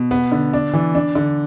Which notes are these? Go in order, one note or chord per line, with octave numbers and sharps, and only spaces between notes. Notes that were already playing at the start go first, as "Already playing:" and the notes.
Already playing: B2
B3
D3
D4
E3
D4
D3